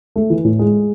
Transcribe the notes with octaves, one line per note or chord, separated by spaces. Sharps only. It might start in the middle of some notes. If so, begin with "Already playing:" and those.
A3
E3
A2
G#3